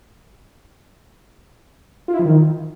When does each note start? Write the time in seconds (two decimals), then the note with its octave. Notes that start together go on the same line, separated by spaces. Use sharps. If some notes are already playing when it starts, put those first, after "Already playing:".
2.08 F4
2.14 E4
2.19 F3
2.25 D#3